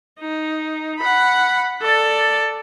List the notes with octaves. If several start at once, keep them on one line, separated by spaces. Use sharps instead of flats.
D#4
F#5 B5
A4 D5